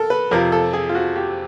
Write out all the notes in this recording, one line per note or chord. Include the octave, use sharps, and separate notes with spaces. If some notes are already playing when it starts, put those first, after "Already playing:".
Already playing: A4 A#4
B4
F2 C3 F3 A#4
A4
G#4
F4
F#4
G4